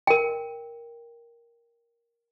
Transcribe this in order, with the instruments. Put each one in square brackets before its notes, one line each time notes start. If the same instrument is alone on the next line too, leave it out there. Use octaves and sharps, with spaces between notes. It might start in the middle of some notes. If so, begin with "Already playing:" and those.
[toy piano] A#4 G5